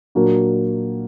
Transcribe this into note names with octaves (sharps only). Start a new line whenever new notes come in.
A#2 F#3 A#3 D4 F#4